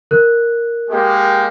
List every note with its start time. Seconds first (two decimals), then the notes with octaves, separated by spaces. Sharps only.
0.11 A#4 F#6
0.89 G#3 A#3 G4